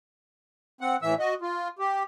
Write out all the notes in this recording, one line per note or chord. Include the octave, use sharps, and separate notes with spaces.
C4 F#5
A2 E3 E5 E6
F#4 D#5
F4
G4